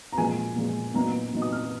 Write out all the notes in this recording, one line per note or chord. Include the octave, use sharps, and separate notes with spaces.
A#5
A#2 F3 G#3 G#5
A#2 F3 G#3
A#2 F#3 B3 D#4 A#5
A#2 F#3 B3 D#4
D#6
F6